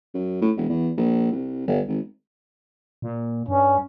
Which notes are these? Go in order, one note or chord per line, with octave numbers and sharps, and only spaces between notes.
F#2
A2
E1
E2
A#1
C2
G1
G#1
A#2
G2 C#4